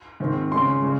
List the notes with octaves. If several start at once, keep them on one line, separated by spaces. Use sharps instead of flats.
G#2 D#3 G#3 C4
C#3 G#3 C#4 C6
C#3 G#3